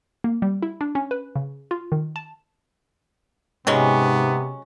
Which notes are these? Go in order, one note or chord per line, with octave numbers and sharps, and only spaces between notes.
A#3
G3
E4
D4
C#4
B4
C#3
F4
D#3
A5
G#2 C3 F#3 G#3 B3 C#4